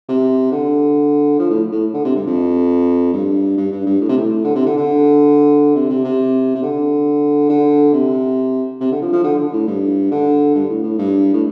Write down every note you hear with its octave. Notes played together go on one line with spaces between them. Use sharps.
C3
D3
F3
A2
A2
D3
C3
G2
F2
G2
G2
G2
G2
A2
C3
A2
D3
C3
D3
D3
C3
C3
C3
C3
D3
D3
C3
C3
D3
F3
F3
D3
D3
A2
G2
D3
G2
A2
A2
G2
A2